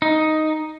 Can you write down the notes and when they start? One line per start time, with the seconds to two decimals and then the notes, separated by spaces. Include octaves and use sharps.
0.02 D#4